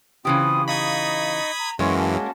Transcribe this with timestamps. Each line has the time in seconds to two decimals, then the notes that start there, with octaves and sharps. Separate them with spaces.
0.25 C#3 E3 C4 F4 G4 D#6
0.68 D#4 D#5 F5 B5 C#6 D#6 G#6
1.59 A#5
1.79 F#2 E3 G#3 A#3 C#4 F#4 C#6
1.98 A5